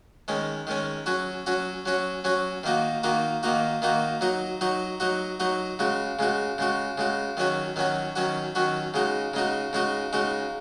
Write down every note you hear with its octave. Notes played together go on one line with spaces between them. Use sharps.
D#3 G#3 C#4
D#3 G#3 C#4
F#3 C#4 F#4
F#3 C#4 F#4
F#3 C#4 F#4
F#3 C#4 F#4
D#3 A#3 D#4 F#4
D#3 A#3 D#4 F#4
D#3 A#3 D#4 F#4
D#3 A#3 D#4 F#4
F#3 D#4 F#4
F#3 D#4 F#4
F#3 D#4 F#4
F#3 D#4 F#4
C#3 G#3 F#4
C#3 G#3 F#4
C#3 G#3 F#4
C#3 G#3 F#4
D#3 F#3 C#4 F#4
D#3 F#3 C#4 F#4
D#3 F#3 C#4 F#4
D#3 F#3 C#4 F#4
C#3 G#3 D#4 F#4
C#3 G#3 D#4 F#4
C#3 G#3 D#4 F#4
C#3 G#3 D#4 F#4